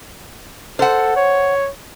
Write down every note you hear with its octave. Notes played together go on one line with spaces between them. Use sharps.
A4 C5 F#5
C#5